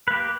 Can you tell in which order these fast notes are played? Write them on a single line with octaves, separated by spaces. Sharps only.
B4 A#3 G4